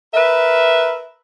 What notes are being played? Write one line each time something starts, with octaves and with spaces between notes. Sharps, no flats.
A#4 B4 E5